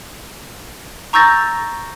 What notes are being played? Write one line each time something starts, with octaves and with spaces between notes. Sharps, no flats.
A#5 C#6 E6 G6 A6 A#6